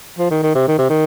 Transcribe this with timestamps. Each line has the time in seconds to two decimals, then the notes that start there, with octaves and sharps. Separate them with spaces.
0.18 F3
0.31 D#3
0.43 D#3
0.55 C3
0.68 D#3
0.78 C3
0.90 D#3